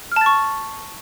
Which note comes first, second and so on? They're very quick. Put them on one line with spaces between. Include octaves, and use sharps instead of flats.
F6 A5 A6 C#6